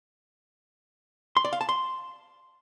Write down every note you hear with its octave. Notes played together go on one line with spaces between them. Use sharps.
C6
D5
F5
A5
C6